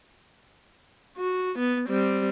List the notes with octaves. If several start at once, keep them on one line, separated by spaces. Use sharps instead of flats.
F#4
B3
G3 C4